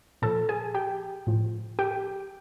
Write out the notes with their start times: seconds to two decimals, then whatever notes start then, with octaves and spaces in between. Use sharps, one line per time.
0.22 A#2 F3 A4 A5
0.49 G#4 G#5
0.74 G4 G5
1.27 A2 F3
1.79 G4 G5